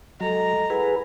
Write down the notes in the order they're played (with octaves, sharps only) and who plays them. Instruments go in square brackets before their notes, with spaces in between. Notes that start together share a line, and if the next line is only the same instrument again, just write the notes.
[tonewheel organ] F#3 [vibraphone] G#3 A4 D#5 [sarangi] A#5
[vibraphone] E4 F#5 B5 [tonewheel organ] G#4 B4